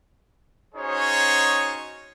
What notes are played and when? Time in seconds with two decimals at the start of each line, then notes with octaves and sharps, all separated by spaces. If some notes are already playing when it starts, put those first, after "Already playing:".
0.75 C#4 D#4 F#4 G#4 C5 C#5